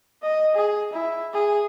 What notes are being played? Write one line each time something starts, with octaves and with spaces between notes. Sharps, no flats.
D#5
G#4
E4
G#4